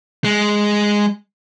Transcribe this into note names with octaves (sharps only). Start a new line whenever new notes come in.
G#3